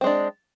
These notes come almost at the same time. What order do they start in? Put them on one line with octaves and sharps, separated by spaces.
C4 G#3 D4